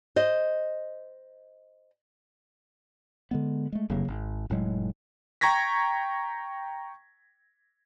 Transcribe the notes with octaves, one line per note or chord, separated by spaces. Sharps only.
C5 D#5
D3 G#3 B3
G#3 A3
F1 C#3 F#3 A#3
G#1
F1 A2 F#3 G#3
G5 A#5 C#6 G#6 A#6 B6